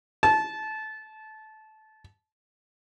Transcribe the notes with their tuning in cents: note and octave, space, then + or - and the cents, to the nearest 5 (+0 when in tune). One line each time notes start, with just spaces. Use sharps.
A5 -20